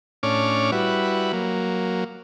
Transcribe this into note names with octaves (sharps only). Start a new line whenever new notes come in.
A2 C#4 D4 C#5 D6 F6
G3 E4 F#4 B4
F#3 A#3